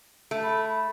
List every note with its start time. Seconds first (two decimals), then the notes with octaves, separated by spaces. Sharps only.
0.31 A3
0.43 B5
0.70 B5